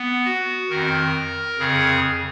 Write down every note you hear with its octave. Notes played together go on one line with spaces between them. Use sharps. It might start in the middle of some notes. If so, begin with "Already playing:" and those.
Already playing: B3
F#4
F2 D#3 A#4
F2 C#3 G#4